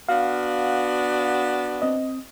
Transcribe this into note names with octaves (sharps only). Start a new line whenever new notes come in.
B3 D4 F#4 F5
C4 D#5